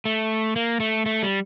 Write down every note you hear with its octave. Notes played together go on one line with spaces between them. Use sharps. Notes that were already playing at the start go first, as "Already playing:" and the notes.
A3
A#3
A3
A3
G3